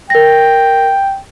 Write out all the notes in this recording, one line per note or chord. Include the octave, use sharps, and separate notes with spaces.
A#4 G5 A#6